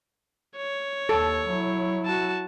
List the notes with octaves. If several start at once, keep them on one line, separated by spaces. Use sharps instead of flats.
C#5
D#2 A4
F#3 E4
F#4 A5